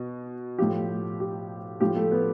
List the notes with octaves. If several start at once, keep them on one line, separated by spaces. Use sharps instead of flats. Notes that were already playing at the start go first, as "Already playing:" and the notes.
Already playing: B2
A2 F3 G4
G4
A2 F3 G4
A3
B3